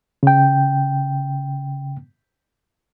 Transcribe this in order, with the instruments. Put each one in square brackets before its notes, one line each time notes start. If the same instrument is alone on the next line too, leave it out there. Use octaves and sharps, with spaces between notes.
[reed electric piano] C#3 G5